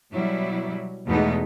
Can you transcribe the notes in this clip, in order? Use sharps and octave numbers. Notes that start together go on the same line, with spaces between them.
B2 F#3 G3 E4
E2 B2 G#3 A3 B3 D#4